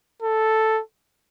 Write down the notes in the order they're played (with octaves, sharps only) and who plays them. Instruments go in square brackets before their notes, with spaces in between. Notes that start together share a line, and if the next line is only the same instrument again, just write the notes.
[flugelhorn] A4